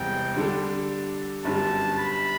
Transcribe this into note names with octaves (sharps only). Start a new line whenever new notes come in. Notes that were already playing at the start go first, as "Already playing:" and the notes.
Already playing: E1 E2 C3 G3 G5
D3 G3 D4 A4
G1 F#2 D3 G3 A5
B5